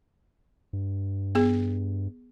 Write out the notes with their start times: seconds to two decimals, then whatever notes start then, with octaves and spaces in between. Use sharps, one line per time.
0.73 G2
1.35 B3 G#4